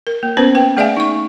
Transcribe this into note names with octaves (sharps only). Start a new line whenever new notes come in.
A#4
A#3
B3 C#4 B4 C5
B4 G5
A3 G#4 D5 E5 F5 G#5
D#4 C#6